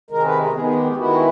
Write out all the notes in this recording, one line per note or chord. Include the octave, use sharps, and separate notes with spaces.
C3 D#3 G#3 A#4
B4
A#4
D#3 G#3 B3 G#4
G#4
G4
G4
D#3 G#3 B3 E4 F#4